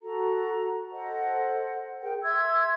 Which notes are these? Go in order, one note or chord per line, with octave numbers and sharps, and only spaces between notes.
F#4 A4 A#5
A4 C5 D#5 F#5
G#4 A#4 G5
E5 C6 E6 G#6